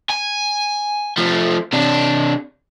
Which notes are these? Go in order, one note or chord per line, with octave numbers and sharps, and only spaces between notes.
G#5
F3 A3
C3 D4